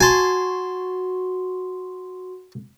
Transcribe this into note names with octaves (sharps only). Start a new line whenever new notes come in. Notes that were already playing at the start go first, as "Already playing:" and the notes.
F#4 G#5 A5 C6